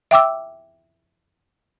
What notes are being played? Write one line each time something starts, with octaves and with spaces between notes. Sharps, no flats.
E5 G5 D6 E6